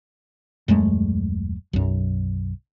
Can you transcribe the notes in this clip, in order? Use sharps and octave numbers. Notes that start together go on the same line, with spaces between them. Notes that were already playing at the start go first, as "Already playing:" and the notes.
D#1 F#2 G#3 A3
B1 F#2